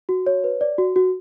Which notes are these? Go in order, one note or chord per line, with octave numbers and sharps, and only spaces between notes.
F#4
C#5
B4
D5
F#4
F#4